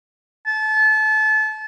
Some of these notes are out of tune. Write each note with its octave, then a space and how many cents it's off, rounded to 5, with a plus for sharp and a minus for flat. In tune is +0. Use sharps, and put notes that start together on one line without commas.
A5 -30